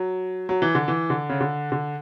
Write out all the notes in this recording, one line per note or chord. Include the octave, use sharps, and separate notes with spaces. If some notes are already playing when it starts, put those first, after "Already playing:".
Already playing: F#3
F#3
E3
D3
E3
D3
C#3
D3
D3